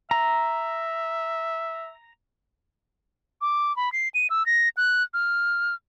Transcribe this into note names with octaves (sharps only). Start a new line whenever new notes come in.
E5 A#5
D6
B5
C7
D#7
E6
A#6
F#6
F6